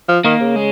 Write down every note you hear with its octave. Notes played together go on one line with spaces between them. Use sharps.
F3
D#3 A#3
C#3
G#3